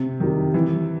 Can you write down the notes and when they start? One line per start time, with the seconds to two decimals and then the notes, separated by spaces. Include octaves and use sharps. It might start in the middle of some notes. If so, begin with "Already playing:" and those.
Already playing: C3
0.20 D#3 G3
0.54 E3